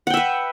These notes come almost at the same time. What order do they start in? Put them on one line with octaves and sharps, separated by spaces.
F#5 G5 E5 B4